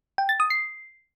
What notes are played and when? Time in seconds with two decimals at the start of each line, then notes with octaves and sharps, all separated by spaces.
0.18 G5
0.29 A6
0.40 D#6
0.50 C7